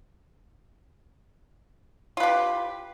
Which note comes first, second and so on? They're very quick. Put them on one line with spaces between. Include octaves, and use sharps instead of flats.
F4 B4 G4